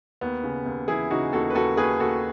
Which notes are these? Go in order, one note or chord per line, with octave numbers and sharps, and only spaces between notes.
D#2 B3
C#3
D#2
E3 E4 G#4
C#3 D#4 F#4
D#2 F#4 A4
B4
D#2 F#4 A4
D#2 G#4 B4
D#2 F#4 A4